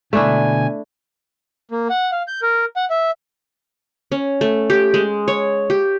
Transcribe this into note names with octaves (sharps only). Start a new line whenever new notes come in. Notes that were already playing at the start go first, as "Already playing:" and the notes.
B2 D3 A3 D4 E4 G#5
A#3
F#5
F5
G6
A#4
F#5
E5
C#4
A3
G4
G#3
C#5
G4